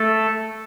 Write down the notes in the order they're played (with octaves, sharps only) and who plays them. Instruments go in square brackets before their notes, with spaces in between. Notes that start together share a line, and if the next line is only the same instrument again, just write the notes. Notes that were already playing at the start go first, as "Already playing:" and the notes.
Already playing: [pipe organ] A3 A4